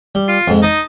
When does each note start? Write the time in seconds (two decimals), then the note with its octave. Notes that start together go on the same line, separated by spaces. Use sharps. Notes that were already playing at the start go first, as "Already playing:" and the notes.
0.15 G3
0.29 F4
0.48 F2 G#2
0.63 D#4 D#5 A5